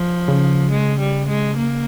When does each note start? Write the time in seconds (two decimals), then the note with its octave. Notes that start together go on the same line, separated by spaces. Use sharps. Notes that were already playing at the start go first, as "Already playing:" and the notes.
Already playing: F3
0.28 C#3
0.71 G#3
1.00 G3
1.29 G#3
1.57 A#3